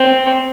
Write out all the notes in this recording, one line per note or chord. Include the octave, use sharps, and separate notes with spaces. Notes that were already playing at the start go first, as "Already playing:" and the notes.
Already playing: C4